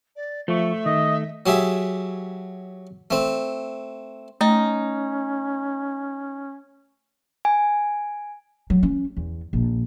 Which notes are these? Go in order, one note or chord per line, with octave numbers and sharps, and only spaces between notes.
D5
F3 A3 E5 C#6
D#3 D#5
F#3 G4 G#4 E5
A3 C4
A3 C#4 D#4
G#5
F#3
C#4
E2
A#1